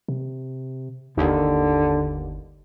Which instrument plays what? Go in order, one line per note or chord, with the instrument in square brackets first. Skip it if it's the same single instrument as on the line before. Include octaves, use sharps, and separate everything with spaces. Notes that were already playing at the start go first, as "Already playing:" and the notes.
[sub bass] C3
[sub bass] G1 [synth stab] D#2 [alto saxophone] D3